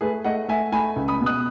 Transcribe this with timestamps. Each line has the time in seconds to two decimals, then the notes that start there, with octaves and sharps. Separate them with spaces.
0.01 A3 G#4 B4
0.24 A3 D#5 F#5
0.48 A3 E5 G#5
0.72 A3 G#5 B5
0.96 C#2
1.08 B5 D#6
1.21 B2
1.26 D#6 F#6